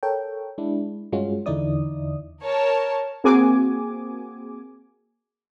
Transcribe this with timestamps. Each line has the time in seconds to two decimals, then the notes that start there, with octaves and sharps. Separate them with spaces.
0.03 A4 A#4 C#5 G5
0.58 G#3 D4 E4
1.12 G2 G#3 C#4 F4 F#4
1.46 E2 D3 D#4 E4 D5 D#6
2.42 A#4 C#5 A5
3.24 A#3 C4 F#4 G#4 G#5 D6